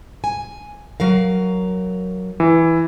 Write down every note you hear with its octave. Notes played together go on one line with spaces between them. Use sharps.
G#5
F#3 A#4 F5
E3